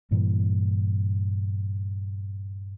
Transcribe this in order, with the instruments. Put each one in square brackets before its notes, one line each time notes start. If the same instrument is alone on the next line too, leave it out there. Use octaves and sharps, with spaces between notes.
[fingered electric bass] G2 A#2 E3 G3